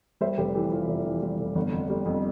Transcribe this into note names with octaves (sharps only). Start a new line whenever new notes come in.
G3 C5 E5
F1 G4 B4
E3 G4
E3 F4
F1
E3
G3
F1
G1
F2
G3
F2